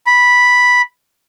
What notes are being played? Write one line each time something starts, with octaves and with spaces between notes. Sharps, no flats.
B5